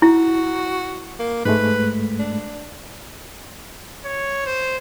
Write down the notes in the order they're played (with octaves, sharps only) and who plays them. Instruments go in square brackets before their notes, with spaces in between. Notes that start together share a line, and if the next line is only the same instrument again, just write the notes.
[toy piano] E4 [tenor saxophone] F#4
[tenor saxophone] A#3
[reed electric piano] G#2 G#3 A3 [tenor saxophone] B4
[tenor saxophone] D4
[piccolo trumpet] C#5
C5